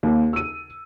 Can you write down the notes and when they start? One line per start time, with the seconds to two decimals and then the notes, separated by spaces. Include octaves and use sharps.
0.03 D#2
0.33 E6 D#7